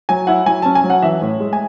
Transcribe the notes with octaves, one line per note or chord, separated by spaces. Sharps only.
F#3 G#5
E4 F#5
F#3 G#5
C#4 A5
G#5
F#3
F#5
E3 E5
A2
G#3
G#5